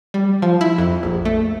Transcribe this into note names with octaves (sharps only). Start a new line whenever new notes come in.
G3
F3
E4
F2
A#1
A3